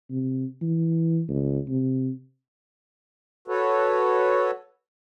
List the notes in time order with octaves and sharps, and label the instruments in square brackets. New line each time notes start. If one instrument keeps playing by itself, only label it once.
[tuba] C3
E3
C#2
C3
[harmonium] F#4 A4 B4 C#5